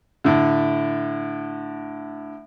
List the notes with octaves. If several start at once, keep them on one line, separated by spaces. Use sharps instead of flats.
A2 D3